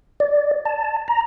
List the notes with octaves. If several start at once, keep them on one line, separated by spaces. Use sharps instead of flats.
D5
A5
A#5